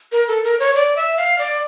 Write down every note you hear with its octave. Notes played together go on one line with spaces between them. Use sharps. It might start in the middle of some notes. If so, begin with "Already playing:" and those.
A#4
A4
A#4
C#5
D5
E5
F5
D5